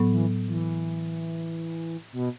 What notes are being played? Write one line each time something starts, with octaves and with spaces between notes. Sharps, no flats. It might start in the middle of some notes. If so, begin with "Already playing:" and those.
Already playing: A2 F#3 B3
E3
E3
B2